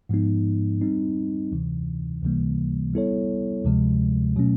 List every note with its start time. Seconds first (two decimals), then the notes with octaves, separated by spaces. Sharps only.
0.09 G#2 F3 G#3 B3 D#4
0.82 G3 C4 D#4
1.52 D2 C3 E3
2.22 C#2 C3 E3 G3 A#3
2.93 G3 B3 E4 A4 C#5
3.65 D2 C3 F3 G#3
4.36 B2 F#3 A3 C#4